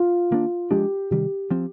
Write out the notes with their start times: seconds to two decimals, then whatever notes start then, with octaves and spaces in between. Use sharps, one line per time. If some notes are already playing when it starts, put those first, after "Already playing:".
Already playing: F4
0.31 D#3 A#3 D4
0.70 F3 G#3 D4 G4
1.11 C3 D#3 G3 G4
1.51 F3 C4